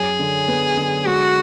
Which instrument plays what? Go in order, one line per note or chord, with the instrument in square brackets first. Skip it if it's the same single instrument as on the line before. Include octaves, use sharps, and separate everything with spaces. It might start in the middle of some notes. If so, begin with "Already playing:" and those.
Already playing: [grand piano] F#2 [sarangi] G#4
[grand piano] D3
B3
D3
[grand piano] G#3 [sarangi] F#4